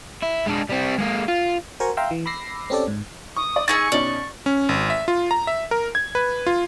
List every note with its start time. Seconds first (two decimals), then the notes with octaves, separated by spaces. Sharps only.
0.23 E4
0.47 G#3 D4
0.70 G3 C4
0.99 G#3 A#3
1.28 F4
1.80 F#4 A#4 C5 G#5 A#5 C#6
1.97 E5 F5 G5 A#5 C6 E6
2.11 E3
2.26 B5 D6 E6 A#6 C7
2.70 C4 C#4 G4 A4 D5
2.88 G#2
3.36 C#6 D#6
3.56 D5
3.68 D#4 G#4 C#6 E6 A6 C#7
3.92 B2 C#4 D#4 D5
4.46 C#4
4.69 G#1
4.90 E5
5.08 F4
5.31 A#5
5.47 E5
5.71 A#4
5.95 G#6
6.15 B4
6.47 F4